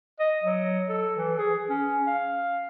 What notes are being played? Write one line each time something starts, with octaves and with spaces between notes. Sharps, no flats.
D#5
F#3
A4
E3
G#4
C#4
F5